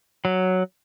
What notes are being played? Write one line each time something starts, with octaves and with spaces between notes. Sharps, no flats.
F#3